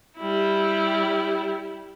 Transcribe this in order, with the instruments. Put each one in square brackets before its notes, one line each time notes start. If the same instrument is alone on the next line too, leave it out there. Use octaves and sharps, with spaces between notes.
[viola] G3 E4